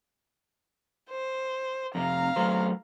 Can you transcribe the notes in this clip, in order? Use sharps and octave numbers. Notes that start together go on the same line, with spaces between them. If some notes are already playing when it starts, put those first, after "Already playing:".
C5
F2 C3 F5 A#5
F#3 A3 C5